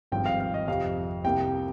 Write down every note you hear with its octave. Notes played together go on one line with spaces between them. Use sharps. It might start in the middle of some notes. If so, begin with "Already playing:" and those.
G#1 G2 F3 C4 G5
F5
F5
D#5
F2 C3 G3 F5
C2 C3 G3 A#3 G5